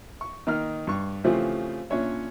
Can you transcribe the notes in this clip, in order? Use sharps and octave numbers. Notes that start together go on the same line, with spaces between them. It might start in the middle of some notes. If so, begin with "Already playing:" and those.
C#6
D#3 A#3 D#4 D#5 F6
G2 C#6
C#3 E3 F3 A3 C4 G4
A#2 C#4 D4 C#5 E5